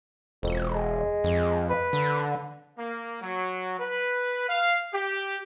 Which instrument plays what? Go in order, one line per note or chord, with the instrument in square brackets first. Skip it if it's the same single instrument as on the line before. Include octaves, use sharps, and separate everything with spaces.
[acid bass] E1 [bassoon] F2
[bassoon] G#3
[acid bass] F2
[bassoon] B4
[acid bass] D3
[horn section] A#3
F#3
B4
F5
G4